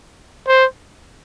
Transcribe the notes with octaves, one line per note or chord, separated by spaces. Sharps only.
C5